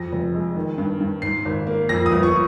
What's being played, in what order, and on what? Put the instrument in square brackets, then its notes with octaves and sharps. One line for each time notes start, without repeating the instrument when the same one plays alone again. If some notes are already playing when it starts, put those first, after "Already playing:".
Already playing: [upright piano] F2 A#6
F1
G#3
D#3
G2
G2
G#2 C7
G#1
A#3
F2 A#6
D#6
G1
C#6